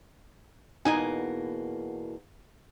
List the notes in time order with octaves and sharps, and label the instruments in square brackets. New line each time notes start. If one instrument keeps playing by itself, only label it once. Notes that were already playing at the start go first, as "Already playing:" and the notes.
[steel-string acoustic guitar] E2 B2 A#3 [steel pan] D#4 G#5